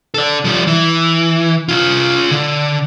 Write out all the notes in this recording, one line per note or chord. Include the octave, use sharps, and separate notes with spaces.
A4 D5
F3 G3
E3
F4 G#4
D3